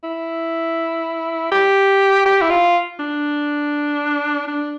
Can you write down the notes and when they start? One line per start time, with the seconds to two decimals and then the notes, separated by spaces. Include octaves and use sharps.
0.03 E4
1.52 G4
2.26 G4
2.41 E4
2.50 F4
2.99 D4
4.48 D4